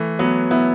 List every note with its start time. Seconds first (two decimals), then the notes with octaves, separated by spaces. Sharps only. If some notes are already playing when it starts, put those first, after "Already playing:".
Already playing: E3 A3
0.19 F#3 B3
0.51 B3 E4